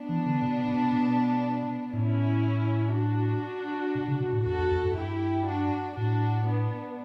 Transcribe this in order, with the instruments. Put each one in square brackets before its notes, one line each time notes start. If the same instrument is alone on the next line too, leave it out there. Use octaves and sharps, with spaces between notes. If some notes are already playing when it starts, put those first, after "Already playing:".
Already playing: [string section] B3 D4
[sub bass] E3
D3
B2
B2
B2
[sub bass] A2 [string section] C#4 E4
[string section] D4 F#4
[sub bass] B2
C#3
B2
A2
[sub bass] E2 [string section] F#4 A4
[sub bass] E2
E2
G2
[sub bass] G2 [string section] E4 G4
[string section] D4 F#4
[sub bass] A2 [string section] D4 F#4
[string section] B3 D4